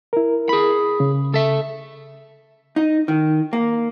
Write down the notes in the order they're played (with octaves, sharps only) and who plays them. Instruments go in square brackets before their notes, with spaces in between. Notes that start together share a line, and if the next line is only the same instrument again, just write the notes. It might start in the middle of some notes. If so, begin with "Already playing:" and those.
[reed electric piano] E4 A#4
[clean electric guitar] G#4 B5
[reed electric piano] C#3
[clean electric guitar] A4 E5
[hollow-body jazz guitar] D#4
D#3
A#3